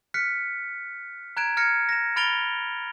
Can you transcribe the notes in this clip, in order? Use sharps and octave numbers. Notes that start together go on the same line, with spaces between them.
F6 F#6 B6 C#7
A#5 F#6 G#6 D7 E7
F6 G#6 A#6 C#7
A#6 E7
B5 F6 A6 D7 F7 G7